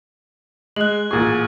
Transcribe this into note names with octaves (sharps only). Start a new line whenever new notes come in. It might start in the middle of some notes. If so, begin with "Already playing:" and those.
G#3 F#6 F#7
A1 A#2 G#4 C#6 G#6